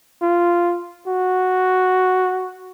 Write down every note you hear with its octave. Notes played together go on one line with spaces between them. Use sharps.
F4
F#4